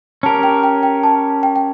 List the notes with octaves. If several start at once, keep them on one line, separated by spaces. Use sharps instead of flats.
C#4 G4 A#4 A5
G5
G5
G5
A5
G5
G5